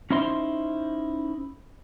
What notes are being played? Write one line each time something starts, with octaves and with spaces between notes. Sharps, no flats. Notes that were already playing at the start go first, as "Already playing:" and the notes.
C#4 D#4 E4 C5 C6